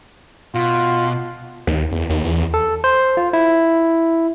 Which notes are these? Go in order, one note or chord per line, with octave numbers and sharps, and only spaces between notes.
B2 F4
D#2
E2
D#2
E2
A4
C5
F4
E4